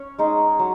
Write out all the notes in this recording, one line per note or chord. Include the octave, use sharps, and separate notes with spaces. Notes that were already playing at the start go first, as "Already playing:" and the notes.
Already playing: C#4 C#5
G#3 D#4 G#4
F#3